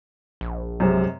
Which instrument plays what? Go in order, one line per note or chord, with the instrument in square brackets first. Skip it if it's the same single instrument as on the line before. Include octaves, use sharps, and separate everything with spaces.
[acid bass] A#1
[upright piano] F#2 C3 G#3